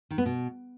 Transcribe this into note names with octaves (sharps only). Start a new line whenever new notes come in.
D#3
B3
B2